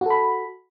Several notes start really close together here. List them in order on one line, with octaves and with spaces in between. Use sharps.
F#4 A4 B5